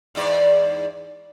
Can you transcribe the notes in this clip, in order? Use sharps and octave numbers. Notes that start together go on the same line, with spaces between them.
E2 G#2 D5